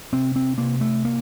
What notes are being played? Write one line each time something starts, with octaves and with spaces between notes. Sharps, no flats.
C3 C4
C4
C3 A#3
A3
A#3